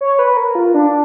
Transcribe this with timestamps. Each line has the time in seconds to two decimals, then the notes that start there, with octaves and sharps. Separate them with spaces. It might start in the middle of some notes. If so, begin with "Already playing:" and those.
0.01 C#5
0.19 B4
0.37 A#4
0.55 F4
0.74 D4